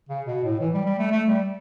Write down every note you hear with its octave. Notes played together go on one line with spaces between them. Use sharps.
C#3
B2
A2
E3
G3
G3
A3
A3
G3